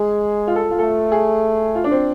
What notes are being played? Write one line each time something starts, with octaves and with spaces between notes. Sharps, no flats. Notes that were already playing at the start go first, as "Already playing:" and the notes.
Already playing: G#3 G#4
F4
A4
F4
A3 A4
G#4
F4
D4
C4